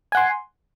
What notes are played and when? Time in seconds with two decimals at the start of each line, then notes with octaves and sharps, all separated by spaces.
0.12 G#5
0.15 F#5
0.17 C6